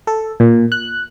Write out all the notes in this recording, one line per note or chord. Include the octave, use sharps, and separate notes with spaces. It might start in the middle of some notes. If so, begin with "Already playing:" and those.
A4
A#2
F#6